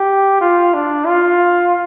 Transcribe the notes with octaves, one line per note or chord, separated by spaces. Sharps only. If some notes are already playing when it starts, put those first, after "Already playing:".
Already playing: G4
F4
D4
F4